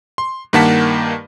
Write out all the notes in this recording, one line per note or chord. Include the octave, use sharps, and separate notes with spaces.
C6
G2 D#3 A#3 F#5 A5 B6